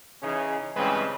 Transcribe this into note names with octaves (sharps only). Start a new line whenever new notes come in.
C#3 E3 C#4 D#4 G#4
G2 C#3 E3 G#3 C4 B4